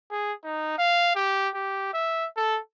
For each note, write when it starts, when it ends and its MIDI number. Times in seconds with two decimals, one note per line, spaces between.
0.11 0.33 68
0.44 0.78 63
0.78 1.12 77
1.16 1.49 67
1.54 1.89 67
1.94 2.27 76
2.37 2.59 69